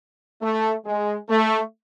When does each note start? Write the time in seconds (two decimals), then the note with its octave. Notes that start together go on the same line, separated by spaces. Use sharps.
0.42 A3
0.85 G#3
1.29 A3